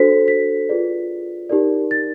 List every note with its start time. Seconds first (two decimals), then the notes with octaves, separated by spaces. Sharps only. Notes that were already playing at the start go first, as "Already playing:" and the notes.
Already playing: D4 F#4 A4 C5 B6
0.28 B6
0.69 F4 G#4 B4 D5
1.49 D#4 G4 A#4 D5
1.91 A6